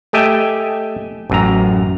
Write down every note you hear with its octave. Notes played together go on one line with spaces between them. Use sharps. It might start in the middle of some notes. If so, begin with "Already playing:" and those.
A3 G4 D#5 E5 G5 G#5
A1 F#2 A#5